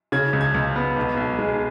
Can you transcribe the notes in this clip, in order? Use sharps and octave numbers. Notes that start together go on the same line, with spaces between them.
C#3 G#6
C#2
G#6
C#2
B3
B1
B1
G#3